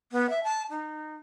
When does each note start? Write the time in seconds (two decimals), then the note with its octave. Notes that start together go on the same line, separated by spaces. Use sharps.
0.12 B3
0.30 E5
0.44 A5
0.70 D#4